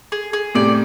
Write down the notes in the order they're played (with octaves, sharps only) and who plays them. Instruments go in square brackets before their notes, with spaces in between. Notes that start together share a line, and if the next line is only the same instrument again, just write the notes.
[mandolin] G#4
G#4
[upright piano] A2 C3 [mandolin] D5